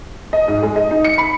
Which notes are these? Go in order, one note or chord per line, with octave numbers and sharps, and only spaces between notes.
D#5
G#2
G#3
D#5
D#4
C#7
B5